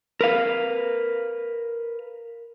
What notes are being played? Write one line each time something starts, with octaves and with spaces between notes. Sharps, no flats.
A#4 B4 F5